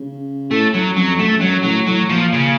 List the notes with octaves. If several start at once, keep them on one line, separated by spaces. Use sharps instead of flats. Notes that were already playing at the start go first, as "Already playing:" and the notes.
Already playing: C#3
A2 A3
F#2 F#3
F2 F#3
F#2 A3
F#2 F#3
A2 F#3
A2 F#3
A#2 F3
C#3